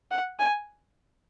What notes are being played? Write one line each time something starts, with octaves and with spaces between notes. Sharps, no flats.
F#5
G#5